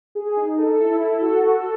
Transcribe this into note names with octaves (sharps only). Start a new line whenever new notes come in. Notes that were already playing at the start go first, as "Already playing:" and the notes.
G#4
D#4
A4
E4
A4
F#4
A4